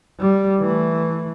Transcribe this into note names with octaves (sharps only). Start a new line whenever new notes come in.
G3
E3 A3